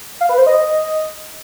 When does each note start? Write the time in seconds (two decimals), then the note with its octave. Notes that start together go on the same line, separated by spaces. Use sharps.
0.21 F5
0.29 B4
0.38 C5
0.47 D#5